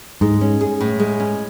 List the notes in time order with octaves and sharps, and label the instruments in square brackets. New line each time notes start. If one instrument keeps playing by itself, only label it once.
[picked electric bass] G#2 [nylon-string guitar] G#3
[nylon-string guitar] C#4
G#4
A2
G#3
C#4